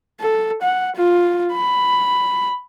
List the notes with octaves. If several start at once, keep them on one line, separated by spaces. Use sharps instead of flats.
A4
F#5
F4
B5